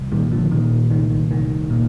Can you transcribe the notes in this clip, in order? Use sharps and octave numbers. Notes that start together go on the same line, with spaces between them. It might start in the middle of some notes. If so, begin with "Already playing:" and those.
Already playing: C2
A#2 D#3 G3
D3 F3
A#2 D#3
C2 D#3
C2 D#3
A#2